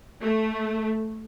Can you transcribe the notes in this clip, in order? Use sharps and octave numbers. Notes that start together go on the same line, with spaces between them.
A3